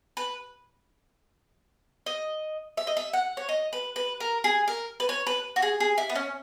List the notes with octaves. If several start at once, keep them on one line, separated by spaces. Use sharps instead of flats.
B4
D#5
E5
D#5
E5
F#5
C#5
D#5
B4
B4
A#4
G#4
A#4
B4
C#5
B4
F#4
G#4
G#4
E4
B3
C#4